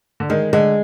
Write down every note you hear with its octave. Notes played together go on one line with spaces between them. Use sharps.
D3
D#3 G#3
D3 G#3